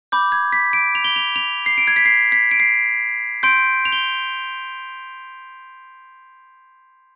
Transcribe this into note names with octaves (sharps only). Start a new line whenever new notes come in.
B5 D6 G6
G#6
B6
D7
F7
G7
F7
F7
C7
D7
G#6
B6
C7
B6
D7
C7
C6 G6 D7
F7
G7